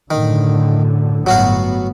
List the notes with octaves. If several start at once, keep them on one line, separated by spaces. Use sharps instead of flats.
F#2 A2 D3 D#3
G1 A2 F#3 B3 F#4 F5